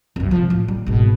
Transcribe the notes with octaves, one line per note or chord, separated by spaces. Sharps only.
C2 F#2
C3 F3
A1
G3
G#1 B2